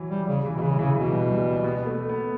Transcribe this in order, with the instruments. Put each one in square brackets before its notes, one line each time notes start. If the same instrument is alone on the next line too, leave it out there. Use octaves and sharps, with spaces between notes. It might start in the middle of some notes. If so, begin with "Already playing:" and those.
Already playing: [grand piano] E3 F#3
[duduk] G3
C#3
[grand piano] E3
[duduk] B2
[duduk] C#3 [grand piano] E3
[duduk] C#3 [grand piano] E3
[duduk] B2 [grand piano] E3
[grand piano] G3
G3
B3
A3
B3